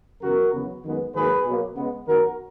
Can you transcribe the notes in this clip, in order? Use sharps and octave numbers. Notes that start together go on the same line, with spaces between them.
F#2 C#3 E3 B3 F#4 A#4
E2 C#3 F#3 B3
F#2 D#3 G#3 B3
G#2 D#3 F#3 A#3 G#4 B4
B2 F#3 A#3
C#3 G#3 B3
F#2 D#3 F#3 B3 F#4 A#4